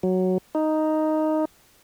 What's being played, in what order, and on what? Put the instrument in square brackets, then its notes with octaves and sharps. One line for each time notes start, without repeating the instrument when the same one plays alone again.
[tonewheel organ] F#3
D#4